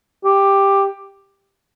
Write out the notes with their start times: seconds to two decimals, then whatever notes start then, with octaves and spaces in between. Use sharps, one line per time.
0.24 G4